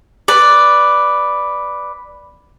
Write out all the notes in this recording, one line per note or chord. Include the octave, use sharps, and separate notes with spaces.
B4 D5